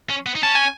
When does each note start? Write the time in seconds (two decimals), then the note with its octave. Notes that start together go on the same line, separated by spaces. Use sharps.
0.10 C#4
0.26 B3
0.35 D#4
0.43 C#4 A5
0.55 G#5